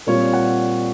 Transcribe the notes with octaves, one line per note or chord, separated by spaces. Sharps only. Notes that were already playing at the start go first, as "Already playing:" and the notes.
A#2 G3 C4 F4 C#5
F#5